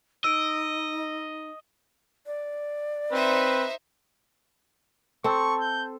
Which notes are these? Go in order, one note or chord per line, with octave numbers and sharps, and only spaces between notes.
D#4 D#5 E6 D7
D5
C4 D#4 B4 C5 E5
C4 A4 C6 C#6
G6